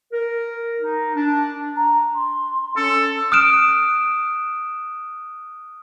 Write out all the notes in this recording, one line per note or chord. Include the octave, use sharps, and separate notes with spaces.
A#4
D#4
D4
A#5
C6
C#4 A4
D#6 F6 F#6 D7 E7